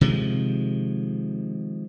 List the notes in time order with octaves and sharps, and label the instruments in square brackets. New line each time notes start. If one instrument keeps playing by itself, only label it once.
[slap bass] C3 D#3 F3 G#3